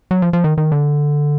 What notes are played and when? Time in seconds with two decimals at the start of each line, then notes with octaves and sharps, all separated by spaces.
0.11 F#3
0.22 F3
0.33 F3
0.44 D#3
0.58 D#3
0.72 D3